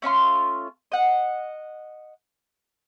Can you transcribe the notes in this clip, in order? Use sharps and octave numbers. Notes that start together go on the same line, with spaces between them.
A3 C#4 F4 C6
D#5 F#5